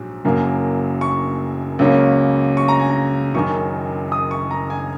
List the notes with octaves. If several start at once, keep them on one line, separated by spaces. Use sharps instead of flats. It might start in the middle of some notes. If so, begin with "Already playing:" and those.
Already playing: A#1 G#2 F#3
F#1 F#2 F#3 A#3
C#6
C#2 C#3 F#3 A#3 C#4
C#6
A#5
G#5
A#5
F#1 F#2 D#3 C#6
D#6
C#6
A#5
G#5